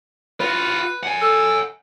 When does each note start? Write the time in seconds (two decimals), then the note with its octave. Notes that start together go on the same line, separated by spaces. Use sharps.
0.40 F4 F#4 B4
1.03 F#5 G#5
1.21 A4